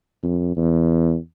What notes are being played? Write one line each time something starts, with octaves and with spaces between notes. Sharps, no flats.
F2
E2